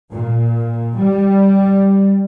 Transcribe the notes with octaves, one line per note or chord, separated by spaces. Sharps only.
A#2
G3